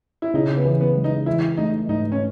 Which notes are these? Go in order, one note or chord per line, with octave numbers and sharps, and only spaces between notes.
E4
C#3 D#4
B3
E3
B3
G#3
D#4
E3 E4
A3 D#4
G#2 D#4
C#4